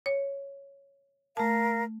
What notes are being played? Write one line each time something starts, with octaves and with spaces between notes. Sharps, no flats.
C#5
A3 A#4 F5 A5